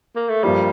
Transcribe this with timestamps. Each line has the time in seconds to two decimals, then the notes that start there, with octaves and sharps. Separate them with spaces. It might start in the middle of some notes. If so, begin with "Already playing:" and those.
0.16 A#3
0.29 A3
0.43 G2 F3 G3 A#3